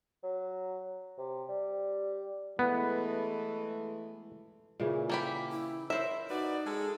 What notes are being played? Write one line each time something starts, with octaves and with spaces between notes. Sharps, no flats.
F#3
C3
G3
E3 G#3 A3 B3
A#2 C#3 E3
A#3 G4 A4 B5
E4
E4 A#4 C5 C#5 E5
D#4 F#4 B4 D5
G#3 G#4 A4